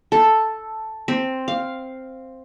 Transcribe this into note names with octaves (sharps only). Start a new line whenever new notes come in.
A4
C4
F5